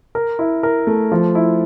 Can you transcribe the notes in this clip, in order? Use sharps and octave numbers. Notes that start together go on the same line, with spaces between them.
A#4
E4
A#4
A3
F3
E4